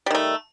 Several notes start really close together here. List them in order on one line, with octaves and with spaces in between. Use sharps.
G3 D#3 A3